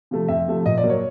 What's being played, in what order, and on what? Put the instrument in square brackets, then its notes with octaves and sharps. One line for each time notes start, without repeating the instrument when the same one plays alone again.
[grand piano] C3 F3 A3
F2 E5
C3 F3 A3
A#2 D#5
D5
F#3 A#3
C#5